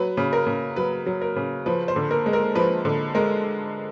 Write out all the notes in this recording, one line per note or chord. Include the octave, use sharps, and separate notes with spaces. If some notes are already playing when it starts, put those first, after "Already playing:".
Already playing: F#3 B4
C#3
A#4
C#3
F#3 B4
F#3
A#4
C#3
F3 B4
C5
D3
A#4
G#3
A#4
F3 B4
D3
G#3 A#4